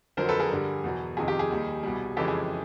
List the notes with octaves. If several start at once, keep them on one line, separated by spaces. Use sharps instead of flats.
F2 D3 F#3 A#4 C5
A4 B4
G#4 A#4
G2 D3 G3
E2 B2 F#3
F2 C3 D#3 G#4
G4
G#4
D#2 D#3 G3
C2 B2 G3
F2 C#3 E3 G#3 G4 A4
G#4